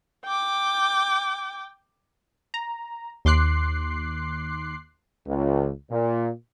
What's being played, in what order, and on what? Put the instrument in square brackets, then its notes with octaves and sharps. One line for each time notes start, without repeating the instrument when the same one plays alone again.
[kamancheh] G5 D6
[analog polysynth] A#5
D#2 C6 D6 F#6 C7
[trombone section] C#2
A#2